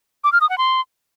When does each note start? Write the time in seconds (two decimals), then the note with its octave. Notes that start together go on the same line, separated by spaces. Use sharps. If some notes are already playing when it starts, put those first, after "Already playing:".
0.24 D6
0.32 F6
0.41 D#6
0.49 F#5
0.58 C6